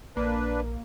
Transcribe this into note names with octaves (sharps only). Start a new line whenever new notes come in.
A#1 A#3 D4 B4